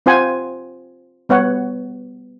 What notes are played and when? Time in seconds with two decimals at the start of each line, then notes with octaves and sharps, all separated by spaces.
0.06 C4 F4 C5 F#5 G#5
1.29 G3 B3 C#5 F#5